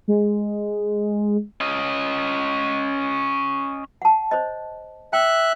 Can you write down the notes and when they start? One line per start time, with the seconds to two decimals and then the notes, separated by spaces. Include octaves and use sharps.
0.08 G#3
1.61 C#4 D#5
4.02 F#5 A5
4.31 C5 C#5 D#5
5.13 E5 G5 F#6